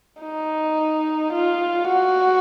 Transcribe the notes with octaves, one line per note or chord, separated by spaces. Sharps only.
D#4
F4
F#4